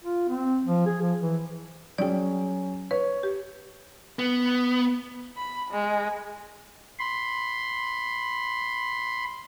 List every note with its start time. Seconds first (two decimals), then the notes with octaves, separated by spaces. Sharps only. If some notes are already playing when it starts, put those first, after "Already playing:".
0.03 F4
0.29 C4
0.66 F3
0.86 G#4
1.01 F3
1.21 E3
1.98 F#3 C#4 G#4 D5 G5
2.91 B4 C#5
3.23 G4
4.19 B3
5.37 B5
5.71 G#3
6.99 B5 C6